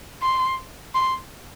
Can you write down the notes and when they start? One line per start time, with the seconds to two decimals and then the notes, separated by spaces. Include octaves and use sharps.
0.22 C6
0.94 C6